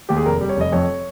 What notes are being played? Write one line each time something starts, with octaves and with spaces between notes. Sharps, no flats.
D#2 G4
G#4
F1 A#4
G3
C#5
F1 D#5
F2 C#5